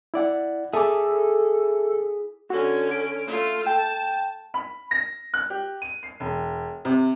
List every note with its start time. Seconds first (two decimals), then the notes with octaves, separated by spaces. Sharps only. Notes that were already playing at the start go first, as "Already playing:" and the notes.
0.14 E4 D5 F#5
0.73 E4 G#4 A4 E5 A5 D6
2.50 D3 C#4 F#4
2.91 D7
3.27 A3 F4
3.66 G5 A5
4.54 B5
4.91 A#6
5.34 F#6
5.50 G4
5.82 D#7
6.03 C7
6.20 E1
6.85 C3